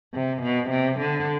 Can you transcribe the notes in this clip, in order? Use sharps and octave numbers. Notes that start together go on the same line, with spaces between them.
C3
B2
C3
D3